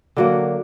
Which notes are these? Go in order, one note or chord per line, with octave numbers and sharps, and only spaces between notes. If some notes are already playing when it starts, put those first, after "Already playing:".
D3 F#3 A#3